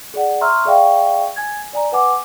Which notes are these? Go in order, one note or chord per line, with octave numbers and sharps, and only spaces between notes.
G#4 D5 F#5
E5 A#5 C6 C#6 E6 F6
G#4 D5 E5 F5 G5 C#6
G#5 G#6
D5 G#5 A#5
B4 F#5 G#5 D6